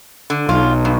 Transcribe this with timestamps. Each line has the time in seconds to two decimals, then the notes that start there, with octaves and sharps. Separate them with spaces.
0.30 D3
0.49 B1 F4
0.85 G2